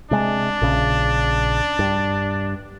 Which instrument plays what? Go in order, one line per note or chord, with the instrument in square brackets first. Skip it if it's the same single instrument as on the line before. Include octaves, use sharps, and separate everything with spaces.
[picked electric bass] C3 G#3 [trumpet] D4
[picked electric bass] A#1 C#3
G2